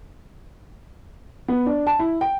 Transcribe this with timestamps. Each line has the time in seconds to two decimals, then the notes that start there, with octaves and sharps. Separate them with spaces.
1.48 B3
1.66 D4
1.87 A5
1.99 E4
2.21 G5